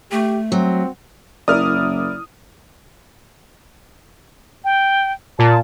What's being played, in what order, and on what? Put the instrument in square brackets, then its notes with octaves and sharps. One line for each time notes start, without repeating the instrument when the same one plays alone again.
[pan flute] A3 [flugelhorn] G4
[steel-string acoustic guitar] F#3 [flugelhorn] C4
[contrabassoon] F#1 [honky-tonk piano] E4 A#4 D5 [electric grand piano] D#6 F6
[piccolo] G5
[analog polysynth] A#2 [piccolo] A5